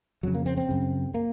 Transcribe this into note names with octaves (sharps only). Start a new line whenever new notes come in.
F2 C#3 F#3
A#3
C4
C4
F#2 C#3
A#3